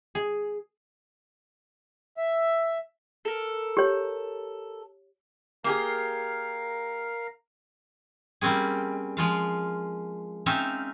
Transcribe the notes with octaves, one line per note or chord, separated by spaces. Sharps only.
G#4
E5
A4 A#4
G4 C#5
A#3 G4 G#4 A#4 F5
G3 A#3 C4 C#4 G#4
F3 G#3 F4 F5
C4 C#4 D#4 E5 F5